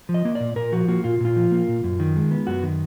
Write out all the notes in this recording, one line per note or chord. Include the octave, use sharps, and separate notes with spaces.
F3
D#5
A#3
D5
A#2
A#2 A#4
F3 F#4
A#3 F#4
A#2 F4
A#2 F4
F3
A#3
A#2
F#2
D#3
G#3
B3
F#2 F#4
D#3